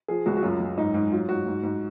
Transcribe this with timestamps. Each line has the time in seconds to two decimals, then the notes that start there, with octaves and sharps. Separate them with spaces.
0.08 F3 G#4
0.26 C#2 F#4
0.37 F#4
0.42 F#2 F4
0.60 F#2
0.77 G#2 D#4
0.94 G#2
1.12 F#3 F4
1.29 G#2 F#4
1.47 G#2
1.63 G#2